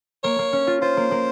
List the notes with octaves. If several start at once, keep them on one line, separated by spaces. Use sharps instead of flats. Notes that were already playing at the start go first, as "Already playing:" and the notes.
A#3 C#5
A#3
C#4
F4
F4 C5
A#3
A#3